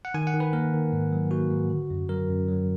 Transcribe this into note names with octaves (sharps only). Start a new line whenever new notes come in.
F#5
D#3 G#5
F#5
D#3
B4
A#3 A#4
D#3
G#2
F#3
A#3 F#4
G#2
D3
F#2
F#3 A#4
F#2
F#3